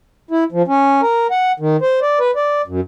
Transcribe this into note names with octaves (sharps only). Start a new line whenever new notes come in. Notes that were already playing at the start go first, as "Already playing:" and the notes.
E4
F3
C#4
A#4
F#5
D#3
C5
D5
B4
D5
F#2